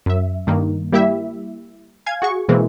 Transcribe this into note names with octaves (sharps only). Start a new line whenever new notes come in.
F#2 E5
G2 D#3 A#3
G3 A#3 E4 G4 E5
F5 G#5 G#6
F#4 G#4 C#6
B2 E3 G#3 A#3 C4